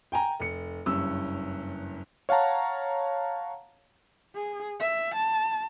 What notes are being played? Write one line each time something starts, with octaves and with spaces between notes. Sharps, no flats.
G5 G#5 A#5
F1 C#7
F#1 G2 C#4 E6
C#5 F5 F#5 A5 A#5
G#4
E5
A5